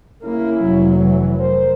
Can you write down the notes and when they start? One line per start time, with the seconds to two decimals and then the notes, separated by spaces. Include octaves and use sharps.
0.23 C#3 A#3 C#4 E4
0.64 F1 F#3
1.01 E3
1.38 A#4 C5